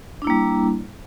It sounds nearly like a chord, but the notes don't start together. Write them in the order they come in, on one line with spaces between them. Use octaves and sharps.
D4 E4 A#3 G3